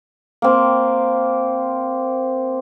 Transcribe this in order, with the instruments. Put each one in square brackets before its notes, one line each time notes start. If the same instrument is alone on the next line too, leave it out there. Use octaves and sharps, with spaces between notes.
[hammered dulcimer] A#3 C4